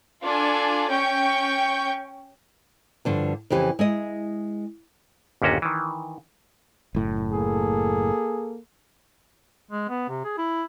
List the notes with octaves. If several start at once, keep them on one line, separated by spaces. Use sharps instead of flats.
D4 F4 A4 G#5
C#4 G5 C#6 G6
G2 D3 F3
F2 C#3 E3 G4
G#3 E4 D#5
G1 D#2 A#2 C#4 F#4
D#3 E3
F#1 A2
A#3 G#4 A4
G#3
B3
C3
G#4
E4